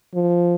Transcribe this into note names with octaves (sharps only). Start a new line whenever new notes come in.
F3